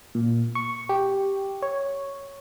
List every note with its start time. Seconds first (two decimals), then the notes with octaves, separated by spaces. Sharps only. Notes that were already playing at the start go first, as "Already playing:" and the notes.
0.15 A#2
0.55 C#6
0.89 G4
1.62 C#5